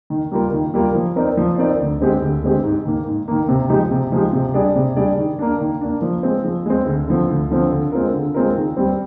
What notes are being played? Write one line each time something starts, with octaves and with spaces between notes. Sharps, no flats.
D#3
G3 A#3 F4 A#4
D#3
G3 A#3 F4 A#4
F3
C4 D#4 A#4 D5
F3
C4 D#4 A#4 D5
D2
D3 G#3 C4 G4
D2
D3 G#3 C4 G4
G#2
D#3 A#3
G#2
D#3 A#3
C3
F3 G#3 D#4 G4
C3
F3 G#3 D#4 G4
C3
G3 D4 G#4 D5
C3
G3 D4 G#4 D5
D#3
A#3 D4
D#3
A#3 D4
F3
G#3 C4
F3
G#3 C4
D2
D3 F3 C4
D2
D3 F3 C4
D3
G#3 C4 F4 A#4
D3
G#3 C4 F4 A#4
D#3
G3 C4